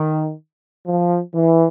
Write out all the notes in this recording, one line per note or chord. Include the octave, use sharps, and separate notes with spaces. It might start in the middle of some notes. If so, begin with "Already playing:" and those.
Already playing: D#3
F3
E3